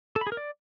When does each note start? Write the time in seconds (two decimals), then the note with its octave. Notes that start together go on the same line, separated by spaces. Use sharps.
0.16 A4
0.21 B5
0.27 G#4
0.32 A#4
0.37 D5